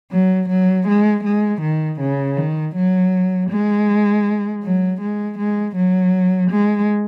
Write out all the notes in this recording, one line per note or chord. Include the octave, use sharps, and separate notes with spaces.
F#3
F#3
G#3
G#3
D#3
C#3
D#3
F#3
G#3
F#3
G#3
G#3
F#3
G#3